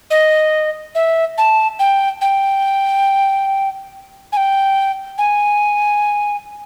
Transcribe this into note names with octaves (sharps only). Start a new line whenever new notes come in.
D#5
E5
A5
G5
G5
G#5
G5
G#5